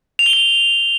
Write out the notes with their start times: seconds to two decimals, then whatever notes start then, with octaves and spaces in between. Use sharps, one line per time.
0.19 F7
0.26 G7
0.33 F7